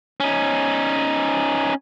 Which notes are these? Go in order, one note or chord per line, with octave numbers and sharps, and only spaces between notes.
C#4 D#4